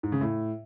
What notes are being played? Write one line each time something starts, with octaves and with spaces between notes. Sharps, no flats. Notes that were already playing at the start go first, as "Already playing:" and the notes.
G#2
C#3
A2